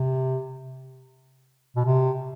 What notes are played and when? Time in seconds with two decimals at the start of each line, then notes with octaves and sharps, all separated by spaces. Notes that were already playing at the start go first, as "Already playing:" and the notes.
Already playing: C3
1.76 B2
1.85 C3